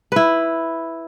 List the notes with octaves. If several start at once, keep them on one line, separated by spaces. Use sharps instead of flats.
E4 B4